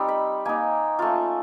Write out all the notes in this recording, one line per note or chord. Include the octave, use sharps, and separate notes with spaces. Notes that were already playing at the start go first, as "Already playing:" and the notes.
Already playing: G3 C4 D#4
B5
A#3 D#4 G#5
A3 C#4 F4